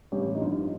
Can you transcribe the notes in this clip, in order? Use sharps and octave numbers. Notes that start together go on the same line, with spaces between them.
A1 G3 G4
D#4
G2 F3 F4